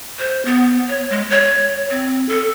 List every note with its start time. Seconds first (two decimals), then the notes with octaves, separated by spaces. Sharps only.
0.19 C5
0.45 B3
0.89 C#5
1.10 G#3
1.30 C#5
1.91 C4
2.29 A4